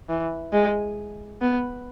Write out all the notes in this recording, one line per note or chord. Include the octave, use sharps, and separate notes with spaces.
E3
G#3
B3